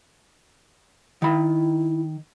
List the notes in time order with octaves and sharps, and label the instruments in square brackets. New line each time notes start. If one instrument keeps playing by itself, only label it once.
[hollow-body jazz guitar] D#3 B5 [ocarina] E4